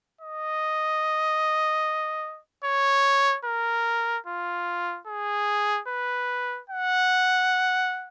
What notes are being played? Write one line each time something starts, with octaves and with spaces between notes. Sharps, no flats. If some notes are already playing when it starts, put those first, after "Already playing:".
D#5
C#5
A#4
F4
G#4
B4
F#5